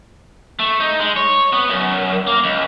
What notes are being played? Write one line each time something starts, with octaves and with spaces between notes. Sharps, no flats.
A3
D#4
G#3
C#5
B3
F#2
A#3
C#2